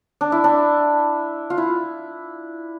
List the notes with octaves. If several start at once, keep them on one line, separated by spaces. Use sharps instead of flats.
D4
E4
D4
F4
E4